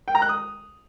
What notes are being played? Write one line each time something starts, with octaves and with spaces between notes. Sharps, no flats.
G5
A#5
F#6
D#6